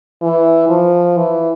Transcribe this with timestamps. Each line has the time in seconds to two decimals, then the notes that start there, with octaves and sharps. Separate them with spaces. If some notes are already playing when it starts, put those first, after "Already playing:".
0.22 E3
0.69 F3
1.17 E3